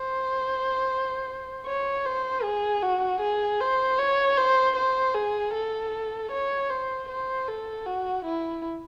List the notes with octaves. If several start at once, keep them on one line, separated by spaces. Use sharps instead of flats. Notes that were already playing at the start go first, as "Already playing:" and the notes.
Already playing: C5
C#5
C5
G#4
F#4
G#4
C5
C#5
C5
C5
G#4
A4
C#5
C5
C5
A4
F#4
E4